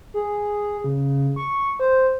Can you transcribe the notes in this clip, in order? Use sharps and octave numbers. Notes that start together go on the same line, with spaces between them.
G#4
C#3
C#6
C5